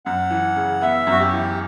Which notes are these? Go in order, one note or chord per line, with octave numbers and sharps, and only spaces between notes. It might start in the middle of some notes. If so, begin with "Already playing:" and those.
F#2 F#5
E3
C#3
B3 E5
F#2 F#4
G4
E3